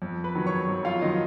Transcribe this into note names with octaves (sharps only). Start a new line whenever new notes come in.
F2
B4 B5
D#3 F#3
C#5 C#6
F2
F4 F5
D#3 F#3 D#5